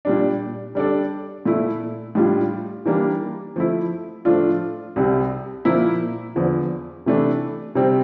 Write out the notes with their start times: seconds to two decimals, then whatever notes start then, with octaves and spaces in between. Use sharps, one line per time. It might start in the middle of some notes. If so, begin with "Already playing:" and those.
0.05 A#2 G3 D4
0.75 G3 D4 A4 D5
1.45 A#2 A3 E4
2.15 A2 G3 D4 F4
2.86 E3 G3 A#3 D4
3.56 F3 A3 E4
4.25 A2 F3 A3 D4 F4
4.96 C2 C3 G3
5.65 A#2 F3 A#3 E4
6.36 E2 D3 F3
7.06 C3 E3 A3 D4
7.75 C3 G3 C4